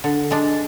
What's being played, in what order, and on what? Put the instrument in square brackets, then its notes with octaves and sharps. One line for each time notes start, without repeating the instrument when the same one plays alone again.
[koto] D3
G#3 D4